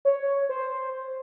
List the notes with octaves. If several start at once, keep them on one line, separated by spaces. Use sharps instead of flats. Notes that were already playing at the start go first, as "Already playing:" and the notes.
C#5
C5